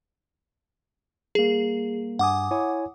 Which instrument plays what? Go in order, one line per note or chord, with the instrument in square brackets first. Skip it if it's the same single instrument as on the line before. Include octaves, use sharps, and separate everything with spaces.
[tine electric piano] G3 A#3 [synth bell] G#4
[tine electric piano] G2 G#5 [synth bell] F#5 D6 D#6
[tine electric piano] E4 C#5 G#5